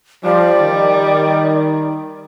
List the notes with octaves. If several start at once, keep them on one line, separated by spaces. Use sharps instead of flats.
F3 G3 D5
D#3